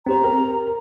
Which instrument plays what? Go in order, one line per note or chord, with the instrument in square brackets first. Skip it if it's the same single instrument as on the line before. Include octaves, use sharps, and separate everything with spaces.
[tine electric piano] C4 G4 C5 [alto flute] A#5
[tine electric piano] A#4